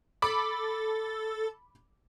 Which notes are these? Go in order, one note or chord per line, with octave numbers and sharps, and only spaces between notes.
A4 B5 D6